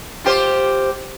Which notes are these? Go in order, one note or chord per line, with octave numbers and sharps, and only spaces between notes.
F4 G4 C5